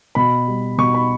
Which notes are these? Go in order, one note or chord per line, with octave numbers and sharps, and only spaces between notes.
B2 B5
G3
B2 C#6
B5